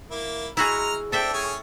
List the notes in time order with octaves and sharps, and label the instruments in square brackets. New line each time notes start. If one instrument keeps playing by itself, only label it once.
[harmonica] A#3 E4
[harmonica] G#3 A#5 F6 [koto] E4 F#4 G#4
[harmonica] C4 D4 [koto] A4 E5 G5
[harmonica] C#4 G#4 G#5